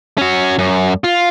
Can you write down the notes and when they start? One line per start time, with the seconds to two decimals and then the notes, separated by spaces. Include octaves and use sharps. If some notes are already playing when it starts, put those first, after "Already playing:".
0.18 C#4 F#4
0.58 F#2
1.04 F4